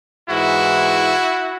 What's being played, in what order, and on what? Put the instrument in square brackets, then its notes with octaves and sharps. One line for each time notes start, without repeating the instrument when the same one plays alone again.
[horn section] G#2 E3 G#3 E4 F#4